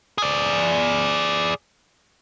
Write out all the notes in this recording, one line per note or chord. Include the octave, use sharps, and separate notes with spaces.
G#4 D5